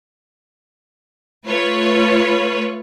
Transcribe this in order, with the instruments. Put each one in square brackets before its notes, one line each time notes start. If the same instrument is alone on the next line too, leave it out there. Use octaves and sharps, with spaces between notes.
[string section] A3 F4 B4 C#5